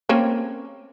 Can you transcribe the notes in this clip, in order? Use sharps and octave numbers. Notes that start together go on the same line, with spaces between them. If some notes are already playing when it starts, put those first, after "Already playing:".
A#3 C4 C#4